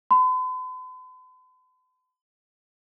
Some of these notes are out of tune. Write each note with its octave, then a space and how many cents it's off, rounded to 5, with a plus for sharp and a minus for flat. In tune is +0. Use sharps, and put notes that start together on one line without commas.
B5 +45